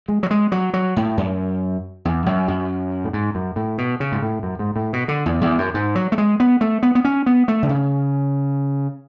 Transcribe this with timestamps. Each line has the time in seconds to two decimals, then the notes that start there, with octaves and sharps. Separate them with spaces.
0.08 G#3
0.23 F#3
0.31 G#3
0.52 F#3
0.74 F#3
0.96 A2
1.17 F#2
2.05 E2
2.26 F#2
2.48 F#2
3.04 A2
3.13 G#2
3.35 F#2
3.56 A2
3.78 B2
4.00 C#3
4.12 G#2
4.22 A2
4.43 F#2
4.59 G#2
4.76 A2
4.93 B2
5.08 D3
5.26 E2
5.41 E2
5.58 F#2
5.74 G#2
5.95 F#3
6.12 A3
6.18 G#3
6.40 B3
6.61 A3
6.83 B3
6.95 B3
7.05 C#4
7.26 B3
7.48 A3
7.63 D3
7.69 C#3